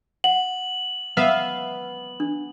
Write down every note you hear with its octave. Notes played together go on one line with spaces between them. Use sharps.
F#5 F#7
B3 E5 F5
D4